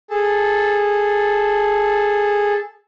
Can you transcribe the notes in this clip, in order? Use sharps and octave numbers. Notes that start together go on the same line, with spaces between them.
G#4 A4 A5